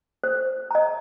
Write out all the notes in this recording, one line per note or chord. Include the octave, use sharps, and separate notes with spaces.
C5
D#5 A#5